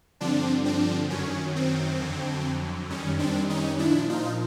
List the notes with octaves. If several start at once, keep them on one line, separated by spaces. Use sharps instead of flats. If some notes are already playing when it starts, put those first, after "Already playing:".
G2 D3 F3 C4 D4
C4 D4
F#2 D#3 F#3 C#4
C4
F2 D3 F#3
F#2 D#3 G3 C#4
C4 D4
C#4 D#4
A#2 F3 D4 E4
D#4 F4